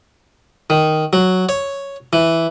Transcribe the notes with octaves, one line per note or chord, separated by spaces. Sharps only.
D#3
F#3
C#5
E3